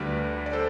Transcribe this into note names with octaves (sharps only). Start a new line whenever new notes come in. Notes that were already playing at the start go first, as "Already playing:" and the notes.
Already playing: D2 D3 G3 B4 D5
D5
A4 C5